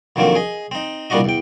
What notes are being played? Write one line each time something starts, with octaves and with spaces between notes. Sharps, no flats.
F2 D3 D#3 F#3 A#3 C4
G#4 D#5
C4 D#4
C2 A#2 G3 D4 F#4 D#5
E2 G5